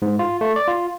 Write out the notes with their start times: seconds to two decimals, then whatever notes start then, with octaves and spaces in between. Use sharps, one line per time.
0.02 G#2
0.19 F4
0.41 A3
0.56 D5
0.68 F4